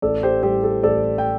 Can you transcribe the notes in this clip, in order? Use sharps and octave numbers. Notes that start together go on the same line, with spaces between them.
A1 A4 D5
G4 C5
A2 G3 G4 C5
A4
A1 A4 D5
G5